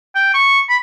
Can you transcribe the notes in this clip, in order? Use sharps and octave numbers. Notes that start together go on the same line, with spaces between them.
G5
C#6
B5